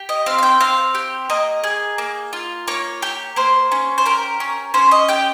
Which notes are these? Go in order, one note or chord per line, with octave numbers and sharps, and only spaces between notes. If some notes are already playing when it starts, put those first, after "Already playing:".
Already playing: G4
D#5
C4 F5
F5
G5
C4 F5
G4
A#3 D#5
G#4
A#3
F4
A#3 C#5
G4
A#3 C5
C#4
C5
G4 A#4
C#4
C#4 C5
D#5
G4 G5